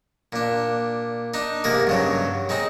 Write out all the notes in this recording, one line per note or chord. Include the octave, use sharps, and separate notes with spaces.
A#2 D4
D4 D#4
G#2 C3 G#3 A#3 A#4
G2 C#3 F#3
G#3 C4 D#4